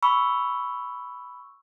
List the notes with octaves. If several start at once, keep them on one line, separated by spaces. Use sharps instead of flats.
B5 C#6 E6